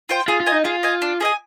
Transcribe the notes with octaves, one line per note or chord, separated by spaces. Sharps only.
F4 C5 G5
F4 G#4
F4
D#5 G#5
D#4
F4 G#4
D#5 G#5
D4
G#4 D#5 G#5